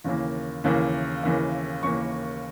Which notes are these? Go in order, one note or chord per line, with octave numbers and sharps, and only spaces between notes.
D#2 C#3 E3 A#3
D#2 C#3 E3 A#3
D#2 C#3 E3 A#3
D#2 C#3 E3 A#3 C#6